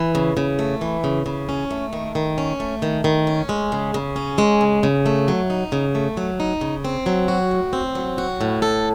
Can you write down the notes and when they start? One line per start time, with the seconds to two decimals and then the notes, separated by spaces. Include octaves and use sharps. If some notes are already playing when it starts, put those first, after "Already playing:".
Already playing: E3
0.15 C#3
0.37 C#3
0.59 A3
0.81 E3
1.04 C#3
1.26 C#3
1.49 C#4
1.71 A3
1.93 D#3
2.15 D#3
2.38 C#4
2.60 A3
2.82 D#3
3.04 D#3
3.27 C#4
3.49 G#3
3.72 C#3
3.94 C#3
4.16 C#4
4.38 G#3
4.61 C#3
4.83 C#3
5.06 A3
5.28 F#3
5.50 D#4
5.72 C#3
5.95 A3
6.17 F#3
6.40 D#4
6.61 C#3
6.85 C4
7.06 F#3
7.28 F#4
7.51 A2
7.73 C4
7.95 F#3
8.18 F#4
8.41 A2
8.62 A4